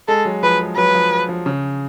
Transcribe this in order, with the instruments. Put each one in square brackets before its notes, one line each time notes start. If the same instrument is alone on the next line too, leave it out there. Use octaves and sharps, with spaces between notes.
[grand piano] G#3 [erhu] A4
[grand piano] F#3
[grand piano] F3 [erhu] B4
[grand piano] G#3
[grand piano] F#3 [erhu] B4
[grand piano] F3
F3
C#3